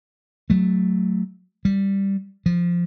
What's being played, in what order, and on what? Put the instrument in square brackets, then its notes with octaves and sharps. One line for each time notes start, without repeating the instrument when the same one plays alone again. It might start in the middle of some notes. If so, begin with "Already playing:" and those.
[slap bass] F#3 A3
G3
F3